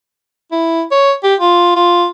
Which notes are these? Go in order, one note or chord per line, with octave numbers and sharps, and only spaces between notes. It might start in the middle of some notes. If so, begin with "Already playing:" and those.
E4
C#5
G4
F4
F4